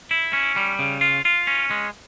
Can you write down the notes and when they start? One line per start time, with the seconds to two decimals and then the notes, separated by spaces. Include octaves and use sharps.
0.11 E4
0.33 C#4
0.56 G3
0.79 C#3
1.01 F4
1.25 F4
1.47 C#4
1.71 G#3